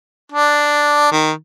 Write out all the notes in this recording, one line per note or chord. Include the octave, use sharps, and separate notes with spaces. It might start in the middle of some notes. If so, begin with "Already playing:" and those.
D4
D#3